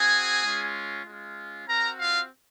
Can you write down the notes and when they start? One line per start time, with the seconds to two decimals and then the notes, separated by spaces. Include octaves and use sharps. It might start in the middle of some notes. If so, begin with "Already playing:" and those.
Already playing: C4 F#4 G#4 G#5
0.44 G#3 C#4 F4
1.06 G#3 C#4 F4
1.67 C4 F#4 A#4 A#5
1.98 F4 F5